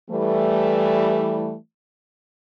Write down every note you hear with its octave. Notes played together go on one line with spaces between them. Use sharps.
E3 G3 A3